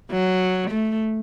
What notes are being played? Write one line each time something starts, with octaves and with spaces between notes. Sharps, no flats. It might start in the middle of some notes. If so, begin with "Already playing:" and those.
F#3
A3